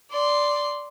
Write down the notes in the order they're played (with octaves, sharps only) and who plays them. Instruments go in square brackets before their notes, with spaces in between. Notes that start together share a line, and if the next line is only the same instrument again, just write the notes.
[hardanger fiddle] D5 C6